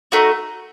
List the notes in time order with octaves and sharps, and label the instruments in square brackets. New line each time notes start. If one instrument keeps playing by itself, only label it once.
[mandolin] A3 D#4 F#4